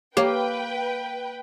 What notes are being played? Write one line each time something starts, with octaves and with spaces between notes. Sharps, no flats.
A#3 G4 B4 C#5 F5 G5